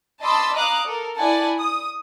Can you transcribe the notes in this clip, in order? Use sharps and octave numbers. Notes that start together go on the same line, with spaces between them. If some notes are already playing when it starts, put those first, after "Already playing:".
D#5 A5 B5 C6 D6 E6
F5 A#5 D6 D#6 F#6
A4 A#4
E4 D5 F#5 G#5 A5
D#6